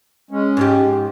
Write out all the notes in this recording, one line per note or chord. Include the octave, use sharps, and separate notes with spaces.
G#3 C#4
G#2 F3 G4